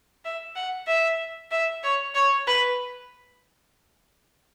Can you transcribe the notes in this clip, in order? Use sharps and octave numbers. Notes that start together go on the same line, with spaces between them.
E5
F#5
E5
E5
C#5
C#5
B4